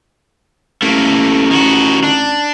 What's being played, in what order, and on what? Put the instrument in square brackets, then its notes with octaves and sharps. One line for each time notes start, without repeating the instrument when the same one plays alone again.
[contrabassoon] A1 [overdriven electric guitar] A3 A#3
[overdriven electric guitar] D#3 F#4
D4